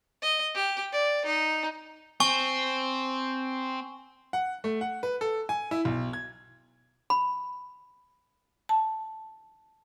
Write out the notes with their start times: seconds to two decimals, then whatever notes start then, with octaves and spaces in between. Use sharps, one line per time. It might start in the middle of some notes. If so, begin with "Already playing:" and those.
0.22 D#5
0.54 G4
0.93 D5
1.25 D#4
2.20 C4 G#5 C#6 G7
4.33 F#5
4.64 A3
4.81 F#5
5.03 B4
5.21 A4
5.49 G#5
5.71 E4
5.85 B1
6.13 G#6
7.10 B5
8.69 A5